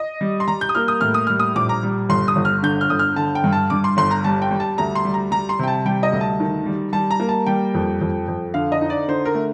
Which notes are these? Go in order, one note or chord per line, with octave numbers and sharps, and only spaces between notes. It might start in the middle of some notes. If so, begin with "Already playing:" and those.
Already playing: D#5
G3
C6
G3 A#5
G6
D#6
A#3 F6
D#6
A2 F6
D#6
G3 F6
D#6
A#1 D6
A#5
G3
G1 C6
D#6
G1
F6
D3 G6
F6
G1 D#6
F6
D3 A5
G5
G2
A5
G2 D6
C6
G1 C6
A#5
G3 A5
G5
G3
A5
D2 A#5
C6
G3
A#5
G3 A#5
C6
C3 G5
A5
G3 G5
D#5
D2
A5
D#3
G3
G3 A5
A#5
A#3
A5
G3 G5
F2
F2
F2
D3 F5
D#5
D#4
D5
D3 C5
A#4
A3